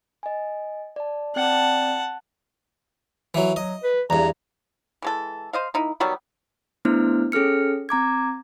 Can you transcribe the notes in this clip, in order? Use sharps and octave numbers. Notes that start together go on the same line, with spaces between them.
D#5 G#5
D5 A5
C4 D5 F#5 G5 A5
E3 F#3
F#3 D#5
B4
E2 G2 A#5
E3 G#3 A4
C5 D#5 F5
A#3 D#4 E4
D#3 F#3 G3 B3
A3 B3 D4 E4 C5 F6
C#4 G#4 A4 F6 C#7
C4 A#5 D6 G#6